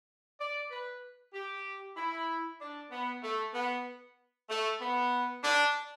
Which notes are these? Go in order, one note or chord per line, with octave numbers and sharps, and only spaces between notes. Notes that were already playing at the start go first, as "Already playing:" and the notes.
D5
B4
G4
E4
D4
B3
A3
B3
A3
B3
D4